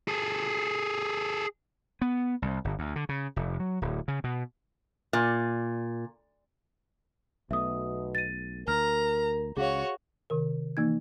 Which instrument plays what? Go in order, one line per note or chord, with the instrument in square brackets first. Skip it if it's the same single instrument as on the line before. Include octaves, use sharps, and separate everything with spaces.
[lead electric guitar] G#4 A4
[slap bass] B3
C2
G1
D2
D3
C#3
F1
F#3
D1
C#3
B2
[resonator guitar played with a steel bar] A#2
[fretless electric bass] B1 A3 [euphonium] B2 [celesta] E5 D#6
[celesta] A6 D#7
[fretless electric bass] D2 [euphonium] A#4 [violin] A#5 [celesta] F6
[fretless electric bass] C#2 C#3 [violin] F#4 C#5 [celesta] G#4 F5
[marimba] C3 D#3 A#4
E3 A#3 D#4 G#6